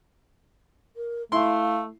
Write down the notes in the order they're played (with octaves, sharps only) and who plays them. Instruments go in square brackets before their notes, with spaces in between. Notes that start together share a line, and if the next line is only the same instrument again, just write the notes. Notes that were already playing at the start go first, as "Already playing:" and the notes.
[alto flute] A#4
[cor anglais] A3 [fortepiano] E4 C6 [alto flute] F5